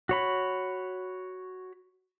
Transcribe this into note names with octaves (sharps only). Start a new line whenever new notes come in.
F#4 C#5 B5